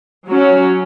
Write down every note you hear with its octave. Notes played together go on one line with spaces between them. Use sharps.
F#3 C#4